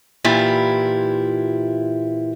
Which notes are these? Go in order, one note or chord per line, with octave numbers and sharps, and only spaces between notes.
A#2 E3 E4 F4 G4